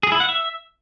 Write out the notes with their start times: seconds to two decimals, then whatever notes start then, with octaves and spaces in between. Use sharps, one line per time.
0.03 G#4
0.12 E4
0.20 F#5
0.29 E5